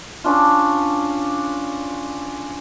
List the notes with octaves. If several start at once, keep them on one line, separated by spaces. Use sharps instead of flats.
C#4 D4 F4